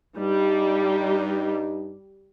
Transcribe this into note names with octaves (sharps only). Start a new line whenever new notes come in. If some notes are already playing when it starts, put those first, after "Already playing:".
G2 G3 D#4